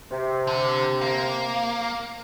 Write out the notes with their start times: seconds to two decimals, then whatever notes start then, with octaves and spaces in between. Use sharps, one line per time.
0.11 C3
0.47 D3
1.01 A#3